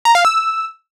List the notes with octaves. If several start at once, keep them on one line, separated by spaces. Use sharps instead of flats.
A#5
F5
E6